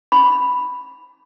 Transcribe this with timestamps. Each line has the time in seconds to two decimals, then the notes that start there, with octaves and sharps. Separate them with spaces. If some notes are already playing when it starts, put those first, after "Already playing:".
0.12 B5